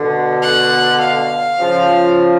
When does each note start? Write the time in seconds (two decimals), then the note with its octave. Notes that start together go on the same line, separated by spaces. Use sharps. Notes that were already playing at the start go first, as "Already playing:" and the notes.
Already playing: B2 D3
0.42 F#5
1.00 F5
1.59 C#3 F3